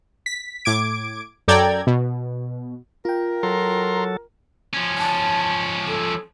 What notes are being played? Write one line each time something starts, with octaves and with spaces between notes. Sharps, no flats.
B6
A2 D6 G#6 D7
F#2 A4 D5 G5 A#5 G#6
B2
F4 A#4 G5
F#3 A4 A#5 C6
F3 C#4
A5
A4